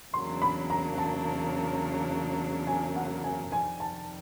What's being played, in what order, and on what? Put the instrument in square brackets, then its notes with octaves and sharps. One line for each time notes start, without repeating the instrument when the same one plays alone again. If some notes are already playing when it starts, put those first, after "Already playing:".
[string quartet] E2 C#3 F#3 A#3 D4 [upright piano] C6
[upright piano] B5
A#5
A5
G#5
F#5
G#5
[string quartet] F2 C3 D#3 G3 [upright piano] G#5
[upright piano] A5